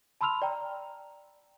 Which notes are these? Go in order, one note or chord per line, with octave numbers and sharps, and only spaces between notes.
A5 B5 C6 E6 F6 F7
D5 G5 A#5